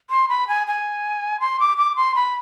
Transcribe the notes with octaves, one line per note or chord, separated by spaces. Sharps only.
C6
B5
G#5
G#5
C6
D6
D6
C6
B5